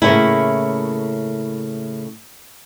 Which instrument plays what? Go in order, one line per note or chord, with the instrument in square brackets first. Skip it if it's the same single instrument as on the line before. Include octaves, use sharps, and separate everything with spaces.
[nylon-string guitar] A2 C#3 A#3 C#4 E4